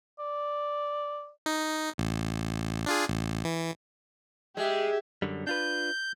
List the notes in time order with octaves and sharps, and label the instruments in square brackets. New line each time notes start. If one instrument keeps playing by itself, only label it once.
[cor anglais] D5
[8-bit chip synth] D#4
A1
D4 F4 G#4
A1
E3
[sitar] G#3 [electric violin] G4 E5
[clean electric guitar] F#2 D3 G3
[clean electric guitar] D4 F4 B4 [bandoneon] G6